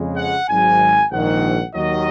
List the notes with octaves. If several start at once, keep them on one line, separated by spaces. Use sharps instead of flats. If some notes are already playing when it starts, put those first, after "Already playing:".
Already playing: F2 C#3 G#3
F#5
G#1 G#2 F#3 G#5
A#1 G#2 D#3 F#5
D#2 D#3 F#3 D#5